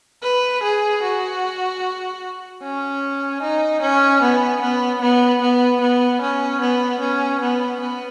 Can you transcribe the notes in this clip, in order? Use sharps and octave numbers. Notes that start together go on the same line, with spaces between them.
B4
G#4
F#4
C#4
D#4
C#4
B3
B3
B3
B3
B3
C#4
B3
C#4
B3
B3